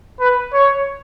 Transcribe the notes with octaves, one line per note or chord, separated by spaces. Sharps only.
B4
C#5